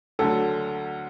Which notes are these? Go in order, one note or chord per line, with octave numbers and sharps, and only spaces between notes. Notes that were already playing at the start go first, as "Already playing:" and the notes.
D2 D3 F#3 A4